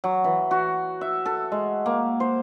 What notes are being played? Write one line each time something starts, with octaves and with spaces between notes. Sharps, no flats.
F#3
E3
F#4
E5
A4
G#3
A#3
C5